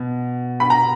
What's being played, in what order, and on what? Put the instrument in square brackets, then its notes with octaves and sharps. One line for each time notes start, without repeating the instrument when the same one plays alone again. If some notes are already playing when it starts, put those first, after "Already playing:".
Already playing: [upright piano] B2
B5
A#5